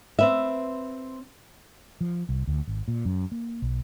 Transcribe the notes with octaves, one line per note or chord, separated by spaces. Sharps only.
C4 B4 E5
F3
C2
D2
G#1
A#2
F#2
A#3
B1